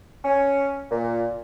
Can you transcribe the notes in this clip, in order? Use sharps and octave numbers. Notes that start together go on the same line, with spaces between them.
C#4
A#2